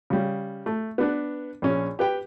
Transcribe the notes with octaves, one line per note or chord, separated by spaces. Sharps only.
C#3 G3
A3
B3 D4 B4
A#1 C#4
G4 B4 G5